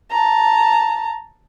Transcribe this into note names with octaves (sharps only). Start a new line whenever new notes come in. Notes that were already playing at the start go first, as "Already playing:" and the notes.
A5 A#5